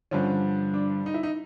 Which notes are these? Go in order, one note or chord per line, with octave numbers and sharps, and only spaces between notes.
G2 D3 F3 C#4
D4
D#4
E4
D#4